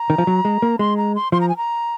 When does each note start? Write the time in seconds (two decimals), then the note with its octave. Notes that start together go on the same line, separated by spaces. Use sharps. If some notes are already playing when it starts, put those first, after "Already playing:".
Already playing: A#5
0.10 D#3
0.18 F3
0.27 F#3
0.45 G#3
0.62 A#3
0.79 G#3 C6
0.97 A#5
1.15 C6
1.32 F3 C6
1.41 A#5
1.49 G#5
1.57 A#5